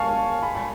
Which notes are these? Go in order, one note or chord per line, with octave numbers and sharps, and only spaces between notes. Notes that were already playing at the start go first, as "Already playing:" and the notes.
Already playing: F5 G#5 A5 C#6
G#5 B5
G#5 B5